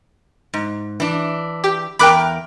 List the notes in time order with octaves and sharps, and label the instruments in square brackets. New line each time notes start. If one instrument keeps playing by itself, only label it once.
[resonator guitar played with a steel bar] G#2
E3 D4
[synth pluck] G4
[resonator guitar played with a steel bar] E2 A#4 G5 [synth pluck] B5 D6 F#6